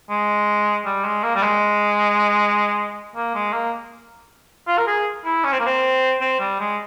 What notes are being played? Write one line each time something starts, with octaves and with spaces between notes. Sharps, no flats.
G#3
G3
G#3
A#3
G3
G#3
A#3
G#3
A#3
F4
A#4
G#4
E4
C#4
C4
A#3
C4
C4
G3
G#3